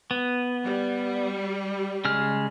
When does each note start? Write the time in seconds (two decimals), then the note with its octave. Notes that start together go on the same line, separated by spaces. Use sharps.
0.11 B3
0.65 G3
2.05 C#3 G#3 F6